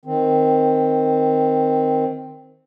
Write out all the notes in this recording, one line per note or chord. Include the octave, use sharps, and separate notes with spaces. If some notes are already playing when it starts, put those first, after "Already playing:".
D#3 C4